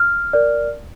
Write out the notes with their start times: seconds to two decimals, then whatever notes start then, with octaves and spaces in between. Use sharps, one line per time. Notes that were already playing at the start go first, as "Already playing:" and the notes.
Already playing: F6
0.33 A#4 D5